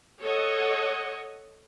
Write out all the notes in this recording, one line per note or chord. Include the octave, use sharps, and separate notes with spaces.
A4 C#5 D#5 F#5